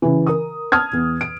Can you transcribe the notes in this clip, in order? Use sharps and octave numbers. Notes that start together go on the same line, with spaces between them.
C#3 E3
A#4 D#6
A5 D#6 F6 G#6
E2
D7